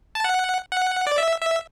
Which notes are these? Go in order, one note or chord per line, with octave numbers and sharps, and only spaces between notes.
A5
F#5
F#5
D5
E5
E5